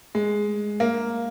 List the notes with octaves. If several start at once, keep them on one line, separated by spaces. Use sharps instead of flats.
G#3
A#3